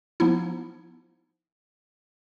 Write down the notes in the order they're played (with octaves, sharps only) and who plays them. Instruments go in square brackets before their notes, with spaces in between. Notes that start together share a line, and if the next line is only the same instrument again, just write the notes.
[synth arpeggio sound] F3 B3 D#4 E4